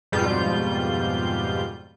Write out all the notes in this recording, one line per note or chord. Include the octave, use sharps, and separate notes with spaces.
F2 G#2 B2 G3 F4 G6